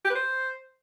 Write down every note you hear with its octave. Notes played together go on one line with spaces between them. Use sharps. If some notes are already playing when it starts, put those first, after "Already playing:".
G4
B4
C5